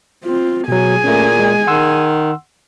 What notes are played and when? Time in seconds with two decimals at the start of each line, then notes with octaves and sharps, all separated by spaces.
0.24 C4 F4
0.68 B2 F#3 G#4 G#5
1.04 A#2 A3 C#4
1.39 G#3
1.67 D#3 F#5 C6 E6